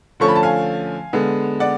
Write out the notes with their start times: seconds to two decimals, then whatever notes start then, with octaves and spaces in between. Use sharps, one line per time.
0.20 D3 F3 A3 C#4 C#6
0.28 B5
0.35 A5
0.43 F5 G#5
1.13 D3 G#3 B3
1.60 D5 F#5